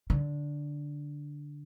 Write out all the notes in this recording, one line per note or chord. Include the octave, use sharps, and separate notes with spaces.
D3